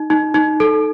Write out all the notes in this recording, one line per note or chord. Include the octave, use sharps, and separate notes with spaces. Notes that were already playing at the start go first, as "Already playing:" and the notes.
Already playing: D#4
D#4
D#4
A4